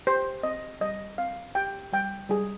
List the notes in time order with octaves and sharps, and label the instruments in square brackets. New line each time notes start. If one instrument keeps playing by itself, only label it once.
[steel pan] G4 C5
C4 D#5
G3 D#5
C4 F5
G4 G5
G3 G5
G3 G#4